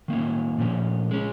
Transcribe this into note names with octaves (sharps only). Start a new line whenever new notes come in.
D#3 A#3 C#4
A#2 F3 C#4
G#3 C#4